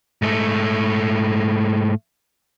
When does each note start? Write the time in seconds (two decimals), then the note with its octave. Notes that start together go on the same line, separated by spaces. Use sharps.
0.22 G#2 A3